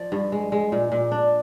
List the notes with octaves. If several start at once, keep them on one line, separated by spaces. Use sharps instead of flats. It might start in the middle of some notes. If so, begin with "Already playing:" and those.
Already playing: F3 D5
G2
G#3
G#3
A#2
A#2
D4